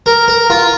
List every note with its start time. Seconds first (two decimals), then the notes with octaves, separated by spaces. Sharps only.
0.06 A#4
0.28 A#4
0.50 F4